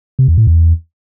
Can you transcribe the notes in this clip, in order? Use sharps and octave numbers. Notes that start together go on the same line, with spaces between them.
C3
E2
A2
E2